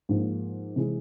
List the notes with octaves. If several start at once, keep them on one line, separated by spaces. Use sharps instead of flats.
G#2 F3 A#3 D#4
C3 E3 G#3